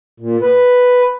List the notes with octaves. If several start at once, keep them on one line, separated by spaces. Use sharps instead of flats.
A#2
B4